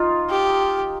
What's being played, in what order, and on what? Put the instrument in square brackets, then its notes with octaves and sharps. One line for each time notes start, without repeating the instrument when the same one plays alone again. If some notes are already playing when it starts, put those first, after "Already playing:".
Already playing: [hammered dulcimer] D#4 F4
[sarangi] G4